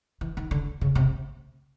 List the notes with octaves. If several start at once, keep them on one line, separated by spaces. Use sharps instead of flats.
E3
D#3
D3
C#3
C3